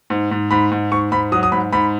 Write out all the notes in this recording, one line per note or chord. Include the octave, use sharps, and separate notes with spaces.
G#2
G#2
G#2 B5
G#2
G#2 C#6
G#2 B5
F#3 D#6
D#6
G#2 B5
G#2 B5